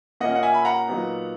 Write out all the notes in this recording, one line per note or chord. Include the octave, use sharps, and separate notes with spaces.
A#2 A#3 C#4 D#5 F#5
F#5
E5 G#5
B5
F#5 A#5
A#2 F#3 B3 D#4